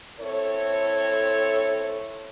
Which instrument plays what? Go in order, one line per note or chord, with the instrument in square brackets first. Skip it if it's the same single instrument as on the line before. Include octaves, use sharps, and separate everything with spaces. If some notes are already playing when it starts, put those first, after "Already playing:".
[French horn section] C4 E4 A4 C#5